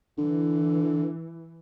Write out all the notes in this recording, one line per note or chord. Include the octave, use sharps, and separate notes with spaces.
D3 E3